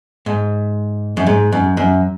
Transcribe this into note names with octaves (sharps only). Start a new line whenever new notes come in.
G#2
F#2
G#2
F#2
F#2